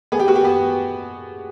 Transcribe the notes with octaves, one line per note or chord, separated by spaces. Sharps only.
B3 G#4
G4
F#4
G4
B3